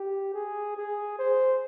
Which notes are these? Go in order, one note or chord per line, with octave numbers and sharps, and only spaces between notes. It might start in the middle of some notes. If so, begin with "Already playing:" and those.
Already playing: G4
G#4
G#4
C5